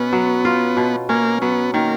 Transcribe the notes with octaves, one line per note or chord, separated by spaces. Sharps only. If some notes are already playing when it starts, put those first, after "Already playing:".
Already playing: B2 B3 C#4
F#3
F4
B2
A#3 C#4
F#3 B3
D#3 A#3